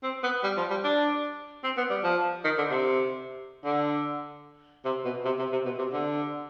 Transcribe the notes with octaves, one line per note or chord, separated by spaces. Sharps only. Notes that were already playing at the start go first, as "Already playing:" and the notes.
C4
B3
G3
F3
G3
D4
C4
B3
G3
F3
D#3
D3
C3
D3
C3
B2
C3
C3
C3
B2
C3
D3